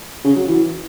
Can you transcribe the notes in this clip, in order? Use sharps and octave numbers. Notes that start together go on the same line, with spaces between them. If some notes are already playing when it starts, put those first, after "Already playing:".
C#3
F#3
E3